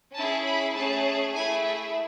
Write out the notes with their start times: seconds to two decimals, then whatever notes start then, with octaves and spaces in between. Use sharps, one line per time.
0.15 C#4 E4 G#4 A5
0.45 B5
0.75 A3 C#4 G#4 A5
1.34 A3 E4 G#4 G#5
1.64 E5